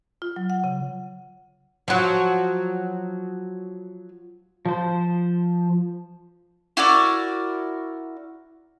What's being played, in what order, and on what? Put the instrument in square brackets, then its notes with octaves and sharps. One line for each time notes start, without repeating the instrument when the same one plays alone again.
[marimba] F4
F#3
F#5
C#3
[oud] F3 F#3
[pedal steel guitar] F3 C5
[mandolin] E4 F#4 A#4 D5